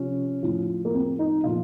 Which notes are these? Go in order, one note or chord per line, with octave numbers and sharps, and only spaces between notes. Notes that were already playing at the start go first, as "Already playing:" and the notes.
Already playing: C3 F3 C#4
A2 F3
A#3
C4
D#4
A#2 F3 F4